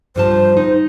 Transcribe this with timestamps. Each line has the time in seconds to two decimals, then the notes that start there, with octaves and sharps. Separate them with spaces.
0.16 G2 F3 C5 A5
0.57 D#4